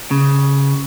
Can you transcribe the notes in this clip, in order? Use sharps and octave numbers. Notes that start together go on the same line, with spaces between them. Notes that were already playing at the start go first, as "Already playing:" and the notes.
C#3